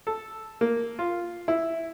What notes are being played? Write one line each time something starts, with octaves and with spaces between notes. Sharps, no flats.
A4
A#3
F4
E4